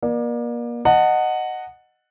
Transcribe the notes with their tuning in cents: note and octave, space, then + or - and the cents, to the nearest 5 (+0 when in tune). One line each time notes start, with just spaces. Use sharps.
A#3 +35 D5 +30
D#5 -10 F#5 +0 A5 +30